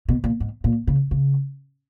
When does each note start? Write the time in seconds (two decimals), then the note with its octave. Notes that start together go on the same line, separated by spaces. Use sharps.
0.09 B2
0.24 A#2
0.40 G#2
0.64 A#2
0.87 C#3
1.11 C#3